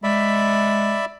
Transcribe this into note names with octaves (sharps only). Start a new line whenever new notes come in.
G#3 D5 E5 B5